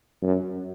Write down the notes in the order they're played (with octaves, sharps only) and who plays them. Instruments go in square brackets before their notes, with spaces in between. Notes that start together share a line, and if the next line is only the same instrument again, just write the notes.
[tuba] F#2